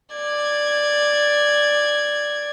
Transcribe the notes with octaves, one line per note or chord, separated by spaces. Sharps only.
D5 G#6